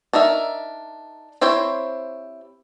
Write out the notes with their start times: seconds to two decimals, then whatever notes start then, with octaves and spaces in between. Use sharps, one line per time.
0.13 D4 D#4 A#4 E5
1.41 C4 E4 G4 C5 C#5